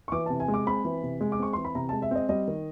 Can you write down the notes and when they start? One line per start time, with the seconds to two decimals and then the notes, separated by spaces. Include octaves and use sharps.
0.08 C#6
0.12 E3 D6
0.26 C3 A5
0.40 G#5
0.48 G#3
0.54 D6
0.67 C4 B5
0.85 E3
1.03 C3
1.21 G#3
1.32 D6
1.39 C4 C#6
1.53 E3 C6
1.65 B5
1.75 C3 A#5
1.89 G#3 A5
2.02 E5
2.11 C4 D#5
2.29 G3 D#5
2.48 D#3